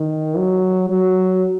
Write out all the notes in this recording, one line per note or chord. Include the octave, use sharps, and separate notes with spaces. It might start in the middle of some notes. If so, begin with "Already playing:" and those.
Already playing: D#3
F#3
F#3